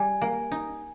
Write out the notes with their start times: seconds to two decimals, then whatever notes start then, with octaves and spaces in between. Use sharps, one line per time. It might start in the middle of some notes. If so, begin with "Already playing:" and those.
Already playing: G3 G#5
0.21 A#3
0.52 D#4